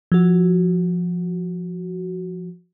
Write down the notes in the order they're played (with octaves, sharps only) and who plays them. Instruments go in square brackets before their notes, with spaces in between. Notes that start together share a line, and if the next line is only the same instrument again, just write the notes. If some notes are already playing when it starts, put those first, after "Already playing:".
[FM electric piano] F3 F#4